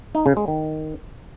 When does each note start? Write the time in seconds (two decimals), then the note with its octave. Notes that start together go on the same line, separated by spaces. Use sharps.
0.15 D#4
0.26 C#3
0.37 G#3
0.48 D#3